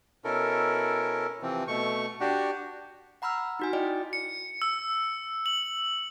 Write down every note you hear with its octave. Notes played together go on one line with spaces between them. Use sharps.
B2 C#4 E4 A4 A#4
C3 E3 F3 C4
B2 A3 C#6
D4 F#4 G4
F#5 A#5 B5 E6 F6
D#4 F#4 G#5
E4 F#4 D5 D#5 G5
C#7
E6
F#7